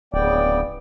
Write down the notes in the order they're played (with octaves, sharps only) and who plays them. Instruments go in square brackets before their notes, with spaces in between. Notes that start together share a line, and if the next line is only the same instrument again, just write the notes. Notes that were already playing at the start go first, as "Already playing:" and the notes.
[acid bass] D1 [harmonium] C#3 B3 G5 [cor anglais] D5